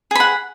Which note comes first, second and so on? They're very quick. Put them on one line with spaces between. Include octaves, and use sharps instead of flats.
G#4 B5 F#5